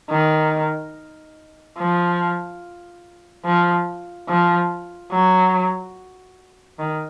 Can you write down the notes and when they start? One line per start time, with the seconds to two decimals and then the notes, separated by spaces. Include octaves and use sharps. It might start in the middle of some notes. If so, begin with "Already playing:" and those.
0.10 D#3
1.78 F3
3.45 F3
4.29 F3
5.12 F#3
6.79 D#3